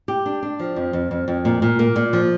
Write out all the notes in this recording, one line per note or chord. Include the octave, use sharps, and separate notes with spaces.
G4
D4
D4
F3
F2
F2
F2
F2
A#2
A#2
A#3
A#2
F3